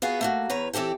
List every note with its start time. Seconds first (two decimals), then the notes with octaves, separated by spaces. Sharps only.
0.02 B3 F4 F#4 G#4
0.21 A3 A#3 F#4
0.50 E2 B4 C#5 A#5
0.73 E3 C4 G4 A4 G5